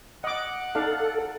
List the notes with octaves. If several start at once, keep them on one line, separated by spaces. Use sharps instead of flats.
D#5 F#5 D6
D#4 A4 D5 F5